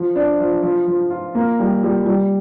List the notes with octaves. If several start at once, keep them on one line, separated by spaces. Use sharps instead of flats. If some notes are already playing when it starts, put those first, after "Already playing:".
Already playing: F3
D4
F3
F3
F3
F4
A#3
G3
G3
G3